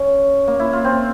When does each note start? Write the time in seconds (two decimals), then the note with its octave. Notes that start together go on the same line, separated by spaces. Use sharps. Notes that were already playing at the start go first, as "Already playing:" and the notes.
Already playing: C#4
0.48 A#3
0.59 E4
0.73 F4
0.84 C4